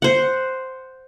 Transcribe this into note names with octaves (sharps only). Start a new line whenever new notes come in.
C5 F#5